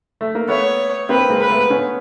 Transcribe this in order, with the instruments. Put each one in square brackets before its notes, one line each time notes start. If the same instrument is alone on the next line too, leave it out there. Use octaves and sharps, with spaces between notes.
[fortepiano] A3
A#3
[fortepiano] A3 B3 [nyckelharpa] C#5
[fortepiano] A#3 C4 [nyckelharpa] B4
[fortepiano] G#3 A#3
[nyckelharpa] B4
[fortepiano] A3 B3
B3 C#4